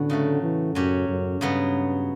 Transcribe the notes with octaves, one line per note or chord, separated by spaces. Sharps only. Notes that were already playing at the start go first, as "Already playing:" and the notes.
Already playing: A2 D3 B3 C#4 F#4
C#3 F#3 A3
E3
F#2 F#3 C#4 G4
F#2
G2 C#3 F#3 B3